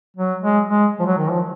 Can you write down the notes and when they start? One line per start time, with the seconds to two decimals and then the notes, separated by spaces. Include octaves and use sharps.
0.17 F#3
0.42 G#3
0.68 G#3
0.99 F3
1.06 F#3
1.18 D#3
1.30 F3